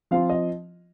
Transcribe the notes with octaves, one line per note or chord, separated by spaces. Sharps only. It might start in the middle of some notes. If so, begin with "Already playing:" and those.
F3 C4 F4 F5
D#5